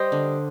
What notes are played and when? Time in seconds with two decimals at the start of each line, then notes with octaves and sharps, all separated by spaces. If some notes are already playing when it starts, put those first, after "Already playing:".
Already playing: G3 C5 D#5
0.12 D3